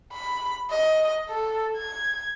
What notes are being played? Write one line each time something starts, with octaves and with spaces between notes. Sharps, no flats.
B5
D#5
A4
G#6